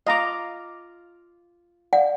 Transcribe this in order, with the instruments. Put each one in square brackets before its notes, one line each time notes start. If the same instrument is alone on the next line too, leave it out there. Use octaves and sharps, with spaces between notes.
[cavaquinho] F4 D6 [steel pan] D#5 A#5
[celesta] D5 F5 [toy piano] F#5